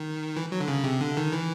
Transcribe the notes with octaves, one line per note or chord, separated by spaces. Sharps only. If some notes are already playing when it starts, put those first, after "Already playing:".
Already playing: D#3
E3
F#3
D3
C#3
C3
D3
D#3
E3